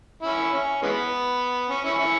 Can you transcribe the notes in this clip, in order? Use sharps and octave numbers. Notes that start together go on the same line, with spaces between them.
C#4 E4
C#4
E3 G#3 B3
C#4
C#4 E4
C#4 E4